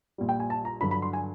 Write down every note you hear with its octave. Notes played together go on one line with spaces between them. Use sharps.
A#1 A#2 G3
G5
G#5
A5
A#5
G2 D3 F#3 B5
B5
C6
G#5